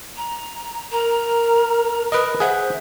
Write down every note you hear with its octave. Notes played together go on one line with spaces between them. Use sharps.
A#5
A#4 A#5
A#4 B4 D#5
G#4 C5 E5 F#5